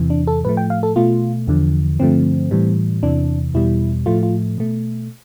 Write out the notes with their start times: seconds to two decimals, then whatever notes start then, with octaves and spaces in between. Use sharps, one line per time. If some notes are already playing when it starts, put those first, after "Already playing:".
Already playing: E2 C3 E3
0.10 D4
0.27 A4
0.45 A2 F3 A3 B4
0.57 G5
0.70 F5
0.83 A4
0.96 B2 A3 F4
1.48 E2 D3 F3
1.99 G2 D3 F3 A3 C4
2.51 A2 E3 G3
3.03 E2 C3 E3 D4
3.54 E2 B2 G3 E4
4.06 A2 F3 A3 F4
4.23 F4
4.58 B2 A3